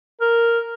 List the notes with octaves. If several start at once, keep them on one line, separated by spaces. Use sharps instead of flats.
A#4